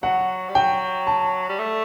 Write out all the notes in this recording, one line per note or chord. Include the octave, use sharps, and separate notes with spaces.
F#3 F#5
G3
F#3 G5
A5
G3
A3